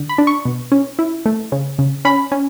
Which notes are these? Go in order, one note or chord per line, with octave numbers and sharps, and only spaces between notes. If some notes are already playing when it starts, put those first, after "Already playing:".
Already playing: D3
B5
D4
C#6
B2
C#4
E4
A3
C#3
C#3
C#4 B5
C#4